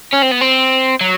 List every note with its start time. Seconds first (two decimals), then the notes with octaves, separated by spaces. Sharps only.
0.13 C#4
0.22 C4
0.31 B3
0.41 C4
1.01 F#3